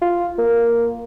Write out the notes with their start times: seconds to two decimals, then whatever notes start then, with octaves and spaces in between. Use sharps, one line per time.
0.02 F4
0.38 A#3